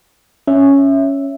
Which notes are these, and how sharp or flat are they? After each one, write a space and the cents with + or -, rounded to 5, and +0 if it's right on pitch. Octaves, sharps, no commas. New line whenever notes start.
C#4 +0 E5 +0